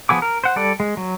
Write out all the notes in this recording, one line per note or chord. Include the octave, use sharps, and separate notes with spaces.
F3 B3 G#4 D6
A#4
C5 F#5
G3 A4 D5
G#3
F#3